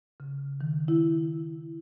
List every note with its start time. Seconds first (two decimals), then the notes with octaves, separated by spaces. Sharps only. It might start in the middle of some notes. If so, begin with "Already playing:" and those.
0.20 C#3
0.61 D#3
0.88 E4